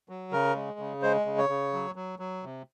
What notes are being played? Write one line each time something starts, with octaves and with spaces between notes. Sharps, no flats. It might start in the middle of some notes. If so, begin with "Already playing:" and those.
F#3
C#3 A#4
G#3
C#3
G#3 C5
C#3
C#5
C#3
F#3
F#3
F#3
C3